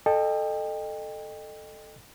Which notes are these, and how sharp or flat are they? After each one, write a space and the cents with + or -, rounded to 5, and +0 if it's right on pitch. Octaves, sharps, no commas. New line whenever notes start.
A4 +0 D#5 -30 G5 +25